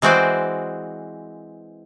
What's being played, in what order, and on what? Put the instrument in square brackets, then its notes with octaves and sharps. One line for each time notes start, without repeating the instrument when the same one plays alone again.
[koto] E3 G#3 C4 F#4 C5 D5